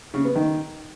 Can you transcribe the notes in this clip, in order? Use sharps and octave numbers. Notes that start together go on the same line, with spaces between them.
C#3
B3
D#3